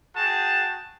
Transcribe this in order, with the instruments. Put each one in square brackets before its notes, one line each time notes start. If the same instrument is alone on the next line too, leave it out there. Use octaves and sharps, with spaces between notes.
[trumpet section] F#4 G#4 G5 A5